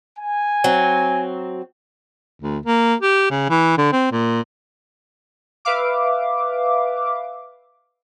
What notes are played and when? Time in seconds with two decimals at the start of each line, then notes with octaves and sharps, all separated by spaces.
0.18 G#5
0.64 F#3 C4
2.41 D2
2.66 A#3
3.00 G4
3.30 C#3
3.50 E3
3.78 D3
3.92 C4
4.11 A#2
5.65 B4 E5 F5 D6